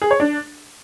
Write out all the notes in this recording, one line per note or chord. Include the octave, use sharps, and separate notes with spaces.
G#4
C#5
D4